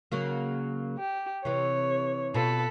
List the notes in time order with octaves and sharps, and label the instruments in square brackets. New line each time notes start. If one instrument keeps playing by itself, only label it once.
[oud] C#3 F#3 A#3
[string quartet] G4
[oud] C3 E3 [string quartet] C#5
[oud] B2 F4 [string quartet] A4 B5